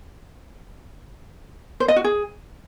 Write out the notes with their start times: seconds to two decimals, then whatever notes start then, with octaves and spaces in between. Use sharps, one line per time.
1.80 C5
1.88 D#5
1.96 F#4
2.04 G#4